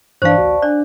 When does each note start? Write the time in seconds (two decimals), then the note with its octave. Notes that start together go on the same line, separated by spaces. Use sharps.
0.22 G2 E3 D4 C5 D5 F5 A5 C#6
0.38 A1 D2 F#4
0.62 D4 D5 G#5 F#6